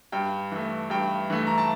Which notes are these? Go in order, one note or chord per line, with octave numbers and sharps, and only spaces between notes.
G2 G5
E3 A3
G2 G5
E3 A3
A#5
A5